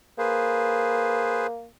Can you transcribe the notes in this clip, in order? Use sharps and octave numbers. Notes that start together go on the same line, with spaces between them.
A#3 G#4 B4 C5